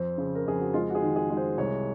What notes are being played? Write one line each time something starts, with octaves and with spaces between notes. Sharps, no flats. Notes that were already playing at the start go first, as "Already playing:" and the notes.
Already playing: F2 C5
C#3
A#4
F2 G#4
F#4
G#3 F4
F#4
G#4
D#3
G#4
G#3
C5
C2 C#5